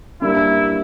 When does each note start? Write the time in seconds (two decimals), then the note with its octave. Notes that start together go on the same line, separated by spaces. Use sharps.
0.22 G2 G3 A#3 E4